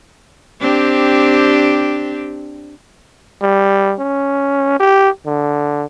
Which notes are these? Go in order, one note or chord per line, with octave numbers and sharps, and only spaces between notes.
C4 D4 G4
G3
C#4
G4
D3